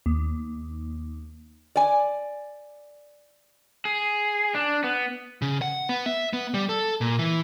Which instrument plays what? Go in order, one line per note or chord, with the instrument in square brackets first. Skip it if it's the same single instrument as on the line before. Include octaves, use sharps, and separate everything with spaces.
[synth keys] D#2
[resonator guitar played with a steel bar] D5 G#5
[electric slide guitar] G#4
D4
B3
[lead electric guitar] C#3
F#5
B3
E5
B3
G3
A4
A#2
E3